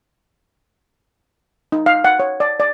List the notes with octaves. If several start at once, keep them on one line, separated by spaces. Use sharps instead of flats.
D#4
F5
F#5
C#5
D5
D5